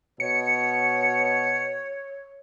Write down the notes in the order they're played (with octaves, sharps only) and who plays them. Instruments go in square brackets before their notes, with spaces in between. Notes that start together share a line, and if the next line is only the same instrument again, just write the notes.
[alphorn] B2 [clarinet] C#5 [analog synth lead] C#7